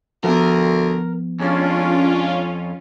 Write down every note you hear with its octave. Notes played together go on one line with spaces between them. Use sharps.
D2 F3 B3 A#4
F2 G#3 C#4 D4 F4